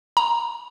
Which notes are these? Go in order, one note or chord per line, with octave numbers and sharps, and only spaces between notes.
A#5